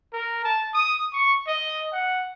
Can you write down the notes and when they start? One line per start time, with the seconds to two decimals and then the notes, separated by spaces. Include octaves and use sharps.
0.13 A#4
0.44 A5
0.74 D#6
1.13 C#6
1.47 D#5
1.93 F#5